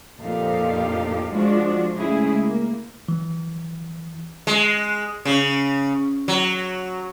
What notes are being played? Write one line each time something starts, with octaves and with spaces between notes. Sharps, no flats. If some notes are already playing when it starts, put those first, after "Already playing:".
F2 A#2 D#4 G4 A4 F5
F3 G#3 D4 F4 F#4
C#3 G#3 A3 E4 G#4
A#3
E3
G#3
C#3
F#3